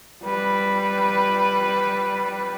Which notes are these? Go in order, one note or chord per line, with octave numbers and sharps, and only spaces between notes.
G3 B4